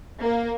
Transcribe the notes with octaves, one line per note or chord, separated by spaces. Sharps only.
A#3